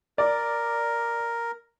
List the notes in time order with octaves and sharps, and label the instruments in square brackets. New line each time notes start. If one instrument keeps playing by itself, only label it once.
[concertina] A#4 [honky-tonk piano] D5